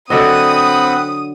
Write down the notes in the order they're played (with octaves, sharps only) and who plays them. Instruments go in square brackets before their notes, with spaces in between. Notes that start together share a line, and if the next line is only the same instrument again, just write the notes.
[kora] D3 F#3 D#5 [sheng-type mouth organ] C4 F#5 B5 [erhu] D#6